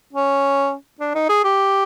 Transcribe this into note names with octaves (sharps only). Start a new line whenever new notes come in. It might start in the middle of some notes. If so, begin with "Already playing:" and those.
C#4
D4
D#4
G#4
G4